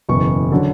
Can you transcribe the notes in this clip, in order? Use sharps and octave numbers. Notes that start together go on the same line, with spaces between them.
F#1 E2 B2 C#6
D3 F#3